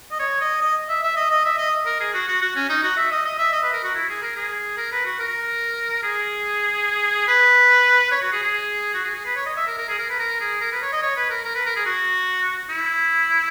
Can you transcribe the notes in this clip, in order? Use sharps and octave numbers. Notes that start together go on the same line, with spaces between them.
D#5
C#5
D#5
D#5
E5
E5
D#5
D#5
E5
D#5
A#4
G#4
F#4
F#4
F#4
C#4
D#4
F#4
E5
D#5
D#5
E5
D#5
B4
A#4
F#4
E4
G#4
A#4
G#4
A#4
B4
F#4
A#4
G#4
B4
C#5
F#4
G#4
G#4
F#4
G#4
G#4
B4
C#5
D#5
E5
A#4
A#4
G#4
A#4
B4
A#4
G#4
A#4
B4
C#5
D#5
C#5
B4
A#4
A#4
B4
A#4
G#4
F#4
E4